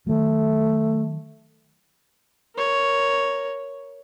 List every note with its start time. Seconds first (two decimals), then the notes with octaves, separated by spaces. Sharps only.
0.07 D#3 F#3 A3
2.55 A#4 C#5